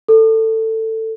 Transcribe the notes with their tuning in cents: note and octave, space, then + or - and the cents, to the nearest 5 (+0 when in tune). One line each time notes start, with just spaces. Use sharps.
A4 +15